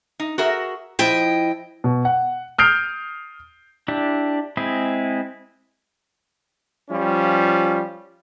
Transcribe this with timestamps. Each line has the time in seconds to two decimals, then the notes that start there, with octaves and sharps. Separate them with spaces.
0.20 D#4
0.38 F#4 G#4 A#4 E5
0.99 F3 E4 D#5 G5
1.84 B2
2.05 F#5
2.58 D#6 F6 G6 C7 D7 F7
3.88 D4 E4 G4
4.57 G#3 C4 E4 G#4
6.90 F3 G3 C#4 F4